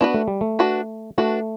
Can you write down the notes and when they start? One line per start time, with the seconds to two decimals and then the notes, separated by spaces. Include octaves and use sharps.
0.01 B3 D4 F#4 B4
0.14 A3
0.28 G3
0.41 A3
0.59 D4 F#4 B4
1.18 A3 D4 F#4 B4